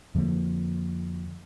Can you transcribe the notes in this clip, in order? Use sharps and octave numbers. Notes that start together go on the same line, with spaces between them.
F2 D3 F3 A#3